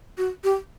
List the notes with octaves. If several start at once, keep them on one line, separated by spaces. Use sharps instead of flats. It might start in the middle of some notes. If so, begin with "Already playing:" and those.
F#4
G4